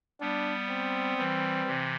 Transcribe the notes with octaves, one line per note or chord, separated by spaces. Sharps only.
G3 B3 D4
C4
E3 G3
C3 E3